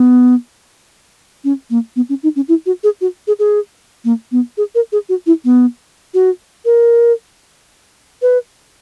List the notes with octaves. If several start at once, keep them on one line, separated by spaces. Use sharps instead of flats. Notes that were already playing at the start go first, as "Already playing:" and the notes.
Already playing: B3
C#4
A#3
B3
C#4
D#4
C#4
E4
F#4
G#4
F#4
G#4
G#4
A#3
B3
G#4
A#4
G#4
F#4
E4
B3
F#4
A#4
B4